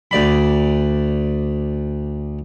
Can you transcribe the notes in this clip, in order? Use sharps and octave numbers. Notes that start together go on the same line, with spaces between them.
D2 D5 B5